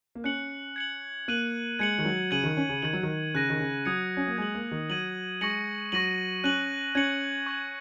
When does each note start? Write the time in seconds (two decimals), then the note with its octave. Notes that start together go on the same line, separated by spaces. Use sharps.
0.15 A#3
0.24 C#4 F#6 C#7 F#7
0.76 G#6 C#7 F#7
1.28 A#3 F#6 D#7 F#7
1.79 G#3 G#6 C#7 F#7
1.98 D#3
2.05 F#3
2.31 C#3 G#6 D#7 F#7
2.44 D#3
2.57 C#4
2.69 C#3
2.82 D#3 G#6 F#7
2.93 F#3
3.03 D#3
3.34 C#3 F#6 A#6 D#7
3.49 D#3
3.60 C#3
3.85 F#3 D#6 G#6 C#7
4.17 C#4
4.27 A#3
4.38 G#3 G#6 F#7
4.55 A#3
4.71 D#3
4.89 F#3 G#6 D#7 F#7
5.41 G#3 C#6 A#6 C#7 F#7
5.92 F#3 C#6 A#6 D#7 F#7
6.44 C#4 F#6 D#7 F#7
6.95 C#4 G#6 C#7 F#7
7.46 C#6 G#6 F#7